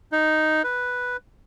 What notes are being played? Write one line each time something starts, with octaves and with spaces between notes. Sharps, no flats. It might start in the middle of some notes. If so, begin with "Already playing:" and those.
D#4
B4